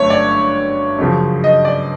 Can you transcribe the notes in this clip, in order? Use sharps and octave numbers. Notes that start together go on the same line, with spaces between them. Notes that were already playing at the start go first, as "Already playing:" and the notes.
Already playing: G1 F#2 D3 A3 C#5
D5
F#2 C#3 F3
D#5
D5